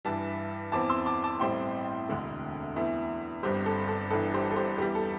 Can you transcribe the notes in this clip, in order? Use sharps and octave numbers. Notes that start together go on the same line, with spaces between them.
G2 E3 G3 E5 A5
E2 E3 C4 A5 D6
C6 E6
A5 D6
A5 D6
A1 A2 G3 C4 G5 C6
E1 D2 D3
E2 E3 A3
G1 G2 G3 C4 G4 C5
A4
A4
G1 G2 E3 A4
G4 C5
A4
G4 C5
E2 E3 G3 G4
A4